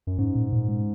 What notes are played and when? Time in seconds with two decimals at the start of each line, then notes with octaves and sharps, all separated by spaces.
0.07 F#2
0.18 G#2 C#4
0.35 A#2
0.52 A#2
0.68 G#3